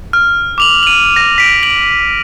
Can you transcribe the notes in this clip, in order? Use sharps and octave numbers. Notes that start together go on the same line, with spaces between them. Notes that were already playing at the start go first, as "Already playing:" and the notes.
F6
D6 F7 F#7
D#7 F#7
A#6
B6 D7
D7 F#7